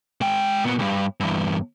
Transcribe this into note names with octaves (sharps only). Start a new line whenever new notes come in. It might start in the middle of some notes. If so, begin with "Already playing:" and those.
G#3 G5
A#2 B3
C2 G2
E2 G2